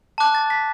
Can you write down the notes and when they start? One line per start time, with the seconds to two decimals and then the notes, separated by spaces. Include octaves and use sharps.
0.18 A5 D6 F#6
0.35 A6
0.50 B6